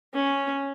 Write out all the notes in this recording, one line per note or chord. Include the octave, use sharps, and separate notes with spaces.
C#4